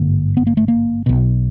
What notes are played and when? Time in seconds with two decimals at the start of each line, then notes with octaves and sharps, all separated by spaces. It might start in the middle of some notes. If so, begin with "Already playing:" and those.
Already playing: G#1 G2 D3 A#3
0.37 B3
0.47 A#3
0.57 A3
0.68 A#3
1.06 B1 B2